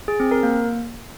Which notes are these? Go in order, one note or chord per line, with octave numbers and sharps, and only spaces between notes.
G#4
C4
A#4
A#3